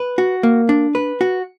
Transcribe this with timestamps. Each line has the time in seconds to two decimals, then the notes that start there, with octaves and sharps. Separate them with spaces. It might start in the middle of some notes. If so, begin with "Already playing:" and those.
Already playing: B4
0.18 F#4
0.43 A#3
0.69 D4
0.95 B4
1.21 F#4